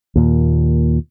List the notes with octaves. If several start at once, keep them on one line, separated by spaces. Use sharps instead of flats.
D#2 A#2